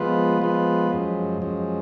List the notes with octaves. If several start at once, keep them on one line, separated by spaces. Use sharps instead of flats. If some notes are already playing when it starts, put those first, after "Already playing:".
Already playing: F3 G#3 B3 F4 B4
F3 G#3 B3 F4 B4
F#2 F3 G#3
F#2 F3 G#3